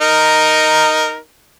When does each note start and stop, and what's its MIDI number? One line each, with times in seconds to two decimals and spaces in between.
0.02 1.17 63
0.02 1.17 70